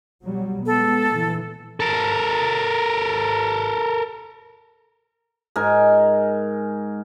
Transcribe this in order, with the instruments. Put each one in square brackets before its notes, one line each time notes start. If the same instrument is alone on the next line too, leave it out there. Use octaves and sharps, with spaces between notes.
[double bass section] B2 F#3 G3
[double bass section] G#3 B3 [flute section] A4
[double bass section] A#2 D3 E3
[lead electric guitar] A4 A#4
[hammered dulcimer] G#2 A#4 G#5